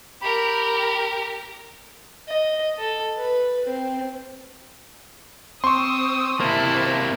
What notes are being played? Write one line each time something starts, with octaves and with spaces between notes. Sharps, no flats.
G4 A#4 B5
D#5
A4
B4
C4
C4 C6 C#6 D#6 E6
C3 A#3 E4 C5 A5